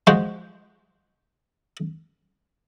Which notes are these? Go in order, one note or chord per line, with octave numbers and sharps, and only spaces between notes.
F3 G#3 F#4 C5